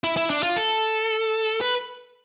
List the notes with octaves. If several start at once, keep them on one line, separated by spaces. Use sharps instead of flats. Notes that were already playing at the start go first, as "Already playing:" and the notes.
E4
E4
D4
F4
A4
B4